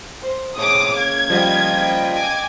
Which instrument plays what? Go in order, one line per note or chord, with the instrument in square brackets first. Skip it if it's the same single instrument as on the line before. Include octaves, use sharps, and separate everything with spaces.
[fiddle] C5
[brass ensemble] A#1 A2 C3 [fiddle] G#4 C#5 [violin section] D6 D#6
[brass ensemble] C#3 A#3 F5 [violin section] G#6
[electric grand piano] F3 G3 [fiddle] D#5 G5
[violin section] G#5 D6 G#6